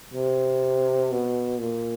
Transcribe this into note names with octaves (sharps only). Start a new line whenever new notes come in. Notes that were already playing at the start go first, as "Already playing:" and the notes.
C3
B2
A#2